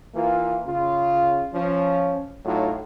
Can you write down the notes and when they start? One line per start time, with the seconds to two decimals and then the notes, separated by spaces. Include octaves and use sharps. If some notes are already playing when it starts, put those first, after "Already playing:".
0.15 E3 A#3 F4
0.66 C#3 F4
1.54 F3 C#4
2.45 A2 F#3 D#4 F4